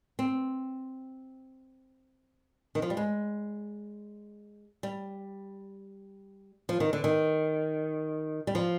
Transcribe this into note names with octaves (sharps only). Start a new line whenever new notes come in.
C4
D#3
F3
G3
G#3
G3
F3
D#3
D3
D#3
G3
F3